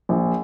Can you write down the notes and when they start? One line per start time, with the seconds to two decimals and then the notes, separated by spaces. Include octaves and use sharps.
0.09 A#1